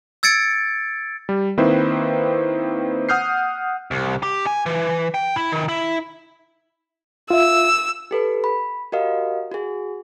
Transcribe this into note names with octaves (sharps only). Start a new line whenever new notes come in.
E6 G#6 A6 C#7 D7
G3
D#3 A#3 C4 E4 B4 C5
F#5 D#6 F6 G6 C7
C2
G4
G#5
E3
G5
E4
D#3
E4
F4 E5 E6
G4 A4 B4
B5
F#4 G4 A#4 D#5 F5
F#4 G#4